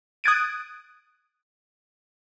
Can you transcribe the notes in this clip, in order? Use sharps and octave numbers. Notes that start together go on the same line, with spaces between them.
D#6 F#6 G#6 A6 D7 D#7